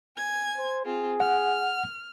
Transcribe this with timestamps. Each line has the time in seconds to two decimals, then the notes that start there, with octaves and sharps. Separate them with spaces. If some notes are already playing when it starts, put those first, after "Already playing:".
0.17 G#5 G#6
0.57 C5
0.85 C4 F4 G#4
1.20 F#5 F6